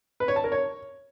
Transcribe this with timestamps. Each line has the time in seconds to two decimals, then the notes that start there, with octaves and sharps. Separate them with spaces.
0.20 B4
0.28 C#5
0.36 A5
0.44 A#4
0.52 C#5